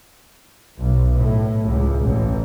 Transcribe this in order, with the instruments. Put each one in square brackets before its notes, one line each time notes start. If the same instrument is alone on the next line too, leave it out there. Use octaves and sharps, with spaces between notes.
[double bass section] B1
A2
C#2
A1